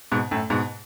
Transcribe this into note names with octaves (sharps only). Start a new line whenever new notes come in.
G#2 B2
F#2 A2
G#2 B2